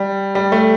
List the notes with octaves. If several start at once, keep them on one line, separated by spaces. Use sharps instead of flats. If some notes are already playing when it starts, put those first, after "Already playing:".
Already playing: G3
G3
A3